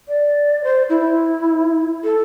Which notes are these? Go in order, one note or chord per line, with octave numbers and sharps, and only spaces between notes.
D5
C5
E4
A4